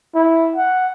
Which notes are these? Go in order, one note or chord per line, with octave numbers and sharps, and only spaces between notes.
E4
F#5